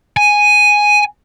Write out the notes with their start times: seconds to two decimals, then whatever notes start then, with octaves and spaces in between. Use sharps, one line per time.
0.17 G#5